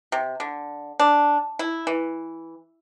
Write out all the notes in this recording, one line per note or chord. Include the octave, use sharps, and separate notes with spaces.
C3
D3
D4
E4
E3